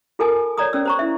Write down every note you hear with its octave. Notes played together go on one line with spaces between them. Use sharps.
F4 A4 A#4 G#5 A5 D#6
C#5 D5 A#5 D#6
C#4 D5 E6
C5 A#5 C#6
E4 E5